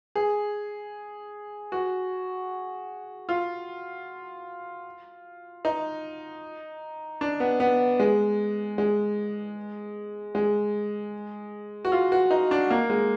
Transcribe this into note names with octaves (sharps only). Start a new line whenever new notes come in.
G#4
F#4
F4
D#4
D4
B3
B3
G#3
G#3
G#3
F#4
F4
F#4
D#4
D4
A#3
G#3